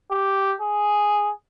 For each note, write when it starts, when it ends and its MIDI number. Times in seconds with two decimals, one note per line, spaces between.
0.11 0.55 67
0.61 1.32 68